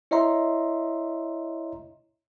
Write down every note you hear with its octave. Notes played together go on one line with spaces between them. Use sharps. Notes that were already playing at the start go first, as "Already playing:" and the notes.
E4 C#5 D#5 E5 A#5 C6